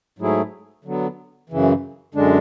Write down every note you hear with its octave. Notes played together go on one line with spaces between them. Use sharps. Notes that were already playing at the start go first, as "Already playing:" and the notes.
G#2 F#3 A3 E4 G#4
D3 F#3 B3
F#2 C#3 E3
F#2 D3 G#3 D4